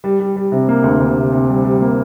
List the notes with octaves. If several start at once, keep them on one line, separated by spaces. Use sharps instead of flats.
G3
G3
G3
C3
A#3
D2
D2
C3
C3
G3
G3
A#3